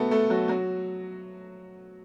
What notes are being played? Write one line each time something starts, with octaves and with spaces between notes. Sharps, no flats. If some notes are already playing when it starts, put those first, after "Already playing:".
Already playing: A3 B3 F#4 A4
A3 A4
F#3 F#4
F#3 F#4